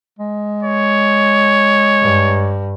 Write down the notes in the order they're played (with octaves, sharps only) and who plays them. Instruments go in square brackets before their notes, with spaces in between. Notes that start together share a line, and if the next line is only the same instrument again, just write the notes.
[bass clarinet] G#3
[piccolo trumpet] C#5
[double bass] G2